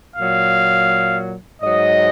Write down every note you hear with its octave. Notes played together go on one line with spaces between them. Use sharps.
A#2 F#3 F5
G#2 F#3 D#5